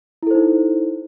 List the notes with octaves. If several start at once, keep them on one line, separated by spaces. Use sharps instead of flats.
D#4 E4 A4 C5